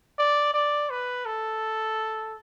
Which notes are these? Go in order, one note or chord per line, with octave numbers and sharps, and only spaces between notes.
D5
D5
B4
A4